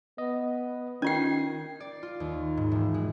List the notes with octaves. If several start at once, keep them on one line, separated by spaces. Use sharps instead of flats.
B3 D#5
D#3 C#4 F4 G5 G#6 C7
D5
F4
D#2
G#2
E1
G#3